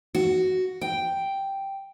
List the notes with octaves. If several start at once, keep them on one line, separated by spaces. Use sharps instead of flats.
F#4
G5